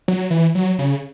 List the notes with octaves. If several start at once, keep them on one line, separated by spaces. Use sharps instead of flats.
F#3
E3
F#3
C#3